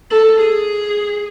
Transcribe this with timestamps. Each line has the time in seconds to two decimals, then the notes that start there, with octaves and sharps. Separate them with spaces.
0.11 A4
0.40 G#4